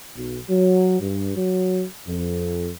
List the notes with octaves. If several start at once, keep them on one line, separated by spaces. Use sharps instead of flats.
B1
F#3
G2
F#3
F2